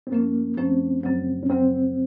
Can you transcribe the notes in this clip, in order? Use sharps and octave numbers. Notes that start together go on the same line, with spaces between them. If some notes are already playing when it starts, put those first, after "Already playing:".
C4
F#2 F3 A3 A#3 C#4
F#2 F3 A3 C4 C#4
F#2 C#3 F#3 C4
C#4
F#2 C#3 F#3 C4